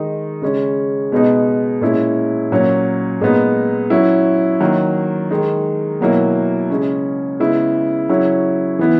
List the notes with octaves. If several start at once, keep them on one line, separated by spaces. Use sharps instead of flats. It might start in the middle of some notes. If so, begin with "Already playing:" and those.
Already playing: D#3 G#3 D#4
C#3 G#3 C#4
B2 G#3 B3 D#4
A#2 G#3 C#4 E4
A#2 F#3 C#4
A#2 G#3 B3 D#4
F#3 C#4 E4
D#3 F#3 A#3
D#3 G#3 D#4
B2 F#3 A#3 E4
C#3 G#3 C#4
C#3 G#3 B3 E4
C#3 F#3 C#4 E4
E3 B3 E4